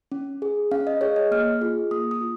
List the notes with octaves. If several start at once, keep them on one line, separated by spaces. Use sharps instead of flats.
C#4
G#4
C#4 F5
D#5
G#4 C#5
D#5
A#3 F6
F4 G#4
A#3 D#6
D#6
F4